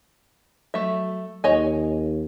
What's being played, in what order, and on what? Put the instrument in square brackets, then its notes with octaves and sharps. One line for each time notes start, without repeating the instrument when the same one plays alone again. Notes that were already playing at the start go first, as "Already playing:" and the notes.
[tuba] F#3 [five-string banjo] A3 E5
[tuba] D#2 [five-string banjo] C#5 D#5 G#5